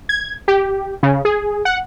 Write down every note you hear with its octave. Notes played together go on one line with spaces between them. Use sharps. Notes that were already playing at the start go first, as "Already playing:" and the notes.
G#6
G4
C#3
G#4
F#5